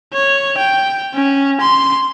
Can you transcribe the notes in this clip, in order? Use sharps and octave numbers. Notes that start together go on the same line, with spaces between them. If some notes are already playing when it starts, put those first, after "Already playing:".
C#5
G5
C#4
C6